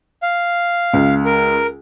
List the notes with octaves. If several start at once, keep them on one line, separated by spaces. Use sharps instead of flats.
F5
C#2
A#4